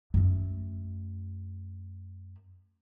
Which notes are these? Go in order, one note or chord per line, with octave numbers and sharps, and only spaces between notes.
F#2 A3